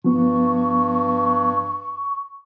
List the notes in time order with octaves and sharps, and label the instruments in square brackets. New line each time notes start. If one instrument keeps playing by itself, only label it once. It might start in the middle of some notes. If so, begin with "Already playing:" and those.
[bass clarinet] G2 [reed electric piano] F3 B3 [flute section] C#6